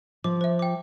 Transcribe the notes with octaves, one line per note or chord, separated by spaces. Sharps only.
F3 D6
C5 E5
G5 D6